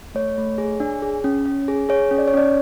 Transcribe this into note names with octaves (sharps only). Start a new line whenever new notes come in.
A3 C#5
A3
G#4
D4
G#4
C#4
C#4
G#4
G#4 C#5
C#4
D5
C#5
C#4 D5